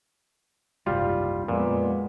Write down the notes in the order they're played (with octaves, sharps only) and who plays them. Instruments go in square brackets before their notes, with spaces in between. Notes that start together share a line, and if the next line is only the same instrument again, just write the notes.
[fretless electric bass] F#1 C2 G#2 [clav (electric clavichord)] G3 F4
[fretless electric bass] F2 [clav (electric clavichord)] A#2 [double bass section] G#3 B3